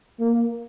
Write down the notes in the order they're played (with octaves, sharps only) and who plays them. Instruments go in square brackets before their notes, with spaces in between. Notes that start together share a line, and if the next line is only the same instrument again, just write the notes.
[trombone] A#3